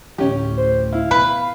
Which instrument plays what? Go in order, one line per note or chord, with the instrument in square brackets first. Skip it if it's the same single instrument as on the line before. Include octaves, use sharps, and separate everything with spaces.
[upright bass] D2 A2 [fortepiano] C#4 G4
[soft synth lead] C5
[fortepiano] E4 [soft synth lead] F5
[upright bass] B2 [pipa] B4